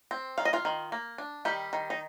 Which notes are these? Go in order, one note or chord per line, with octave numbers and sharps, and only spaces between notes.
C4
D#3 F5
D#5
F4 F5
D#3
A#3
D4
D#3 G3 G4
D#3
D#4